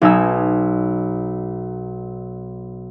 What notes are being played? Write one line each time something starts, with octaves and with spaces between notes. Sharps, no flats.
B1 D#4 G#5 E6